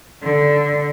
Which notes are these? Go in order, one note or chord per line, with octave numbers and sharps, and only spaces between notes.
D3